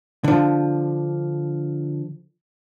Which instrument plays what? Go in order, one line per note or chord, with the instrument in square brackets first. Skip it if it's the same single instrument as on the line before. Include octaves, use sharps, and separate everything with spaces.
[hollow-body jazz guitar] D3 F3